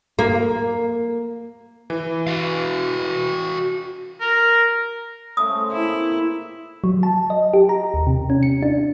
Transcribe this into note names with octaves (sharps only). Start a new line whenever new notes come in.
A#3
E3
F#4 F5
A#4
C#3 A3 C5 D#6
A#3 C4 E4
F#3
A5
D#5
G4
A#5
D#2
C3
C#4
C#7
D4